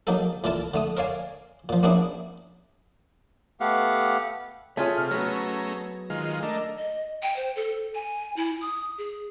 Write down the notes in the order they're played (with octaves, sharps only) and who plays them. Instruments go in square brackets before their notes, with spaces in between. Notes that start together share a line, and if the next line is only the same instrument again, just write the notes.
[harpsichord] F#3 A#3 D#4 G#4 A4
C#2 A#2 E3 A4 A#4 A5
D3 A3 D#6
A#4 C#5 D5 F5 G#5
A#2 F3
A#3 B3 C#4 D4 E4 G#4
[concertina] A3 B3 G4 F5 F#5
[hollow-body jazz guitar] A3 F4 G#4 [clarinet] C#5
[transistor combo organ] C3 [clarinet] F6
[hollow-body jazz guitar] F#3 B3 [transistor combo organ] A3 C#4 A#5 [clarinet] G#4
[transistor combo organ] D#3 G#3 F4
[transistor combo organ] A3 D4 A#4 [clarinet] D#5
[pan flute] D#5
G5
C5
A4
G#5
E4
D#6
G#4